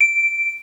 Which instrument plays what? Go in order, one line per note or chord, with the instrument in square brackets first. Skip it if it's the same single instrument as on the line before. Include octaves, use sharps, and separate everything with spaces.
[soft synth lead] D7